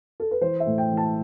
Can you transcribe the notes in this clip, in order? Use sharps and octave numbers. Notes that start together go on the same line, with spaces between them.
A4
B4
E3 C5
E5
A2
G5
E3
A5